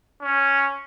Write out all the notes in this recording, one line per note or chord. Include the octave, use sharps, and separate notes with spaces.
C#4